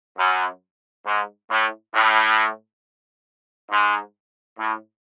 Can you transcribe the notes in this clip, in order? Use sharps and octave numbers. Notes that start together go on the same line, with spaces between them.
F#2
G#2
A2
A2
G#2
A2